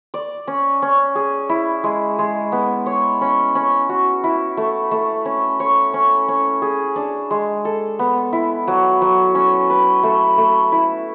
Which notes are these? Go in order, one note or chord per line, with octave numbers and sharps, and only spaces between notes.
D5
C#4
C#4
G#4
E4
G#3
G#3
B3
C#5
C#4
C#4
F#4
E4
A3
A3
C#4
C#5
C#4
C#4
G#4
D4
G#3
A4
B3
E4
F#3
F#3
C#4
B4
A3
A3
E4